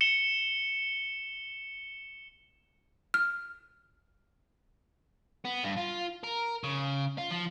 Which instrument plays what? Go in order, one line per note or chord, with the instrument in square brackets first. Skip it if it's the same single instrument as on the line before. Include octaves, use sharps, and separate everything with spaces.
[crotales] C#7 E7 G7
[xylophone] F6
[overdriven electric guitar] B3
G2
F4
A#4
C#3
F4
F3